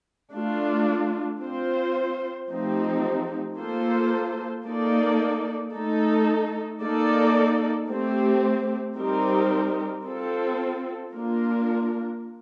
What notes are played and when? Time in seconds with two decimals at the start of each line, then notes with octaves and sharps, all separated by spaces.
0.33 A3 D4 F4
1.41 C4 F4 C5
2.49 F3 A3 C4 D#4 G4
3.57 A#3 F4 A4 C5
4.66 A#3 D#4 A4 D5
5.74 A3 D#4 A4
6.81 A#3 D#4 A4 D5
7.89 A3 C4 G4
8.97 G3 C4 D#4 G4 A#4
10.05 C4 F4 A4
11.13 A#3 D4 F4 A#4